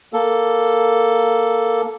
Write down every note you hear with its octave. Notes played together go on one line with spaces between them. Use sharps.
A#3 A4